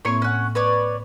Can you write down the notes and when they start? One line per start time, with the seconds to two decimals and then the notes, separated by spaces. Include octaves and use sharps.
0.05 A2 A#3 C4 E4 C#5
0.22 C#4 F#5
0.55 B4 C#5 D5